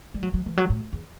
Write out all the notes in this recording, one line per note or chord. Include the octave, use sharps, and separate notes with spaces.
G3
F#3
F#3
E3
F#3
A2
E2